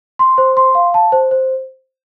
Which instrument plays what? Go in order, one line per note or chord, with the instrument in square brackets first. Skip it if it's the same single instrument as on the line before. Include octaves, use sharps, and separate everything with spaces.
[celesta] C6
C5
C6
F5
A5
C5
C5